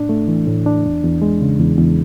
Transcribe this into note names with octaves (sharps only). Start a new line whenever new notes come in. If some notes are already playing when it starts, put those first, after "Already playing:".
Already playing: A2 D4
A3
E3
A2
D4
E2
E2
G#3
C#3
E2
E2